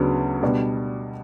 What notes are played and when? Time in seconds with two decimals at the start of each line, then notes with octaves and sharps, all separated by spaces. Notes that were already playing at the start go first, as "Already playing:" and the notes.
Already playing: D2 C#3 F#3 B3 D4
0.42 B2 G3 D4 G4 D5